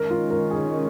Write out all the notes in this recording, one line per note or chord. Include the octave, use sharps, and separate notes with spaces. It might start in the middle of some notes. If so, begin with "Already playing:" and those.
Already playing: D#3 G#3 C#4 A#4
F4
A#4
G#4